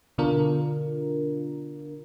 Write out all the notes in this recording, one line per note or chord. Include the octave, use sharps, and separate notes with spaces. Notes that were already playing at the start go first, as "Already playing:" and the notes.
B2 D3 D4 F4 A#4